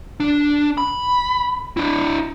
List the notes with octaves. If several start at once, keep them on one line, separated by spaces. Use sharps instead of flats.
D4
B5
D4 E4